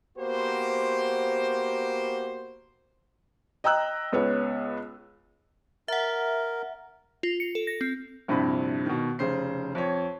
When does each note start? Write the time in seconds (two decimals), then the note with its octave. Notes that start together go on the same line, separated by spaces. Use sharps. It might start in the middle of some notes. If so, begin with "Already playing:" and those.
0.18 A#3 B3 F#4 G4 C5
3.64 D#5 G5 A#5 E6 F#6
4.12 C#2 B3 C#5
5.88 A#4 E5 F#5
7.23 F4
7.40 C#7
7.55 A4
7.67 A#6
7.81 C4
8.28 A#1 G2 C3 E4 B5
8.86 B2 D#3
9.19 F1 C#3 C5 C7
9.75 F2 C#5